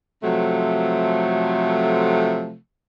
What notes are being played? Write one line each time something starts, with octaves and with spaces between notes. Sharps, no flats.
C3 F3 F#3 A3